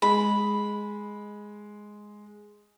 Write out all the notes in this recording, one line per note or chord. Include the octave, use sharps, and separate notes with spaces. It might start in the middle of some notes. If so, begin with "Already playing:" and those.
G#3 B5